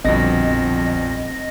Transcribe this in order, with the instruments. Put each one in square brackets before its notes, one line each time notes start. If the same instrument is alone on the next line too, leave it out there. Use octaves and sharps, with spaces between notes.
[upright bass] A#1 G3 [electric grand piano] F2 B2 D3 [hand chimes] C4 [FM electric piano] D#5 A#6